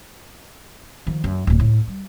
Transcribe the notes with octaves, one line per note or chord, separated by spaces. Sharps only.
D#3 F3
F#2
D1 A#2
A2
G3